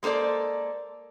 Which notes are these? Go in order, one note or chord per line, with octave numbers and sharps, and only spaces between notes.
G#3 A#3 A4 C5 D5